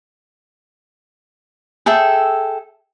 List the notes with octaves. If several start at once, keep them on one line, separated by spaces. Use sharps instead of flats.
G#4 A4 E5 G5